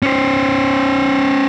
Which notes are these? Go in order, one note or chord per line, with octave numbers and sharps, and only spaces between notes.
C#4 C5